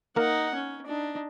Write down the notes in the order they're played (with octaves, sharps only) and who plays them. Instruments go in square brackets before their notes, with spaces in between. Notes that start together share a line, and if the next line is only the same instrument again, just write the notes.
[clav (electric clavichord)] A#3 A#4 [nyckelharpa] D#4 F#5
[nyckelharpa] C#4
D4 D#4